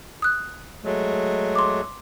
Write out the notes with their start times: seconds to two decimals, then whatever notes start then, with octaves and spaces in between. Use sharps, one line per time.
0.22 D#6 F#6
0.84 F#3 G#3 A3
1.55 C6 D6